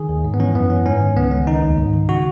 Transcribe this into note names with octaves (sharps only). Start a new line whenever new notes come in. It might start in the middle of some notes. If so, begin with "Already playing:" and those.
Already playing: D#3 G#4
D#2
G#2
B3
E3 C#4
F#2 B3
E3 C#4
G#2 C#4
D#3
C#2 B3
C#2 C#4
D#3 D#4
D#2
G#2
D#3
C#3 F#4